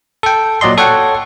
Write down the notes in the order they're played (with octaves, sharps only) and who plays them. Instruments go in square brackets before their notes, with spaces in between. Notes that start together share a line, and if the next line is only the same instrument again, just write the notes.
[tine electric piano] A4 G5
A#2 F#3 D5 D#5 C6
A4 C#5 F#5 G5